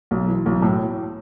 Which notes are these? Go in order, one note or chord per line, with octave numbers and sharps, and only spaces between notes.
B1
E3
B1
A2